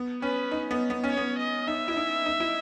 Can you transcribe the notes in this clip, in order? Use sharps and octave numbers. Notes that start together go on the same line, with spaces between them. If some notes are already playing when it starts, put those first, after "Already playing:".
Already playing: B3
C#4 B4
D#4
B3
B3
C#4
C#5
B3
D#5
D#4 E5
E4
D#4
D#4
E4